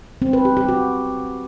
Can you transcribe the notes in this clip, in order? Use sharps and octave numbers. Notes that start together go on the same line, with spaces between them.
C4
B4
G4
G4
F#4